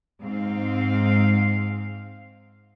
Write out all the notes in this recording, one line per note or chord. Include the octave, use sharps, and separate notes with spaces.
G#2 C4 F5